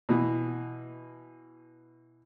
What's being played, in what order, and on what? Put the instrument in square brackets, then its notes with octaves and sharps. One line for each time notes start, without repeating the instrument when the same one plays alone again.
[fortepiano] B2 E3